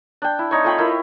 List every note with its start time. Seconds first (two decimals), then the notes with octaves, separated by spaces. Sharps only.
0.22 D4 G5
0.39 E4
0.51 C4 D#4 C#5
0.64 A3 F4 G5 B5
0.78 E4 A#4